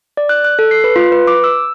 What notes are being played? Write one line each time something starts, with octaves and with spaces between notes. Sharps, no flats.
D5
F#6
F#6
A4
C7
B4
F4
B4
D6
E6